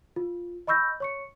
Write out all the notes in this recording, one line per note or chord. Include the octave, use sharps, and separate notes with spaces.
F4
D#5 B5 C#6 E6 G6 A#6
C#5 C#6 C#7